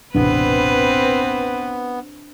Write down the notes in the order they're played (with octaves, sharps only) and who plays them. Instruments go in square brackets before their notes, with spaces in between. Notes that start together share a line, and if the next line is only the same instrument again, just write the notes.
[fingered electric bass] E1 A1 C3 [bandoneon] B3 [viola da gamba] C4 B4 [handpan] D4